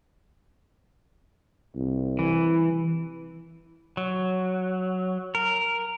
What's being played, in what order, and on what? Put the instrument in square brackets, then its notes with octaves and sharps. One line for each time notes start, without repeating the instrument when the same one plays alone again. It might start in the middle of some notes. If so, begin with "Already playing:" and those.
[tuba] C2
[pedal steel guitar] E3
F#3
A#4